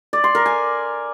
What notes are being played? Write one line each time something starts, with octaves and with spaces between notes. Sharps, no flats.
D5
C6
A#4
G#5